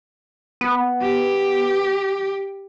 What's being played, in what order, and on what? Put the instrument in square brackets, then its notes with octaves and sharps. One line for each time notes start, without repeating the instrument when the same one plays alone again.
[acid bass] B3
[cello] G4